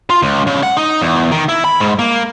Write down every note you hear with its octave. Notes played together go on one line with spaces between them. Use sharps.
F4
C#2
C#3
F#5
D#4
E2
D#3
E4
B5
G#2
A#3